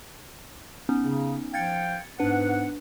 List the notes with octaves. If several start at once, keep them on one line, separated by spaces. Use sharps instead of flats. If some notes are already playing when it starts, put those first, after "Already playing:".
B3 C#4 D#4
C#3
F3 F5 G5 G#6 A6 C#7
G#2 B3 D4 B4 F#5